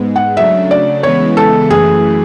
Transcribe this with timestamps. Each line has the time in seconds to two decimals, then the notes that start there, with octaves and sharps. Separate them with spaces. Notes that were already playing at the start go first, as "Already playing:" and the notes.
Already playing: G#2 G#3 B3
0.16 F#5
0.37 C#3 F#3 A3 D4 E5
0.71 D5
1.03 C#3 E3 G#3 B3 E4 C#5
1.37 A4
1.70 F#2 E3 A3 G#4